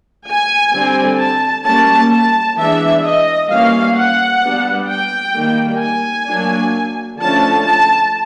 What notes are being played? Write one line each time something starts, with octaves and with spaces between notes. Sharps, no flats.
G#5
D3 G3 C4
A5
G3 A#3 C#4 A5
A5
E3 G#3 B3 D4 E5
D#5
E3 G3 A#3 C#4 F5
F#5
G3 B3 D4
G5
D#3 G3 A#3
G#5
F#3 A#3 D4
D3 F3 A3 C#4 A5
A5